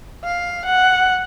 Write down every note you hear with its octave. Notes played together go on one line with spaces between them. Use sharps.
F5
F#5